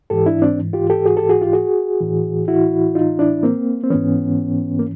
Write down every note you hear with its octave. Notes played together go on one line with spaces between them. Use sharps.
G#2 E3 G4 A4
D4 E4
C4 D4
F4 G4
G4 A4
F#4 G#4
G4 A4
F#4 G#4
F4 G4
F#4 G#4
A2 E3
E4 F#4
D#4 F4
D4 E4
A#3 C4
C4
G#2 E3 B3 C#4
A#3